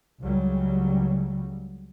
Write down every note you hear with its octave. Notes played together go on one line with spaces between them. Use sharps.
C#2 C#3 F#3 G3